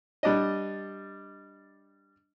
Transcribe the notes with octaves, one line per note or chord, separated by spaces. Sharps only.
G3 D4 D#5